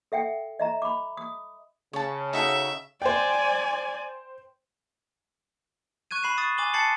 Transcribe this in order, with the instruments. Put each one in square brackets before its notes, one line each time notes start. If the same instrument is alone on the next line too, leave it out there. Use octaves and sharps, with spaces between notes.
[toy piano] A4 E5 F#5 G5
D#5 E5 A#5
B5 D6
D#6
[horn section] C#3 [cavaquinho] C#5 A5
[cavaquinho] D#4 F#4 A4 [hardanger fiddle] E5
[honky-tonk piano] C5 G5 [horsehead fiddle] D5 G#5
[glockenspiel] C#6 F#6 G#6 D#7
B5 C7 E7
C#6 D#6 A6
G#5 D6 F#7 G7
A5 G#6 A6 C7 C#7 F#7